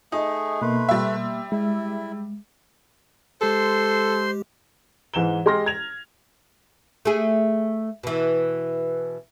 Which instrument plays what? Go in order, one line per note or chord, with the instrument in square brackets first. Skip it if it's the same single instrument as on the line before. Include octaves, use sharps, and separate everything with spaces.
[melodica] A3 G#4 [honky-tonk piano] D#4
[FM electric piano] B2 A#3 C6 [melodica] A3 B4
[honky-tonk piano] G3 E5
[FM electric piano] G#3 [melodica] E4
[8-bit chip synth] G#3 G4 [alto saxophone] A4 [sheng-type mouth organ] C5 C6
[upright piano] G#2 E3 E7 G7
G#3 G4 C6 F6 A#6
G#6 F7
[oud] A3 G#4
B2 E3